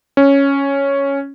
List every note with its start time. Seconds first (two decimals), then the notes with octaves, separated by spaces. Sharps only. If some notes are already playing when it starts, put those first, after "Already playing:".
0.17 C#4